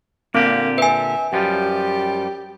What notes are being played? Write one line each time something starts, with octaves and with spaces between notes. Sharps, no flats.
A#2 D3 A#3 C4 G4
B4 E5 G#5
F#2 F3 G3 G4